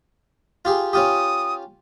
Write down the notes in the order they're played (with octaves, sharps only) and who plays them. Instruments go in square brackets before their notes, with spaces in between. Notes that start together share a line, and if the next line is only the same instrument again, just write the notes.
[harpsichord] F4 G4 G#4
[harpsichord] C#4 F4 G4 [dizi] D#6